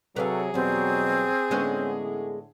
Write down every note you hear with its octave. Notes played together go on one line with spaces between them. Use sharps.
C3 F#3 G#4 A4 B4 D5 F5
E2 B2 F#3 G3 C4
A2 D3 G#3 B3 C#4